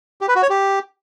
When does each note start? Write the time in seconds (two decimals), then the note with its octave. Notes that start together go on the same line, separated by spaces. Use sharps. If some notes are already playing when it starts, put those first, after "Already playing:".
0.21 G4
0.28 B4
0.36 F#4
0.43 C#5
0.50 G4